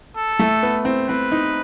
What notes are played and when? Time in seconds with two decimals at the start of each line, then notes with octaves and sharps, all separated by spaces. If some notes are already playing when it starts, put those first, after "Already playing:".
0.17 A4
0.39 A3
0.63 B3
0.85 C4
1.08 C4 B4
1.32 D#4